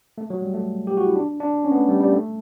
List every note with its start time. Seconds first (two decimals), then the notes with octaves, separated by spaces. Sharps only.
0.18 A3
0.30 F#3
0.42 G3
0.54 A3
0.87 G4
0.97 F#4
1.06 E4
1.16 D4
1.40 D4
1.65 C#4
1.72 B3
1.76 A3
1.88 G3
2.01 G3
2.13 A3